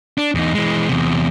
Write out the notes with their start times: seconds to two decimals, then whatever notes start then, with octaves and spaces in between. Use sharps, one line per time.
0.18 D4
0.35 E2 D#4
0.55 E3 G#3
0.89 E2 C3